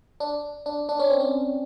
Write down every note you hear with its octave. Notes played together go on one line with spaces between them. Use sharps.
D4
D4
D4
C#4
C4
C#4